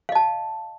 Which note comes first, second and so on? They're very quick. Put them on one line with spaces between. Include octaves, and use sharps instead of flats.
F5 D#5 A5